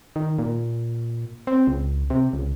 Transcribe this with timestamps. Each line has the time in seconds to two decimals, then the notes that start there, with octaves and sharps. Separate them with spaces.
0.16 D#3
0.39 A#2
1.47 C4
1.67 C#2
2.10 C3
2.33 C#2